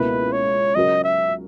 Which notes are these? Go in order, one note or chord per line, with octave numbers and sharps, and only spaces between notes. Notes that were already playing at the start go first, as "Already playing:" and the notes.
Already playing: C#2 B2 A#3 E4 B4
C#5
C#3 F#3 C#4 F#4 A#4 D#5
E5